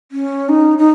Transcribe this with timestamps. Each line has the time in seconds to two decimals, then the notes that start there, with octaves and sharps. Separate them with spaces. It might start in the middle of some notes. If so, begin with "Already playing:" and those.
0.12 C#4
0.49 D#4
0.78 D#4